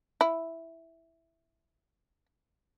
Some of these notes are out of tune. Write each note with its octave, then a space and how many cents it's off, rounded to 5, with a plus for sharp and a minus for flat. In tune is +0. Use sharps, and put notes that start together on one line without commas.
E4 +0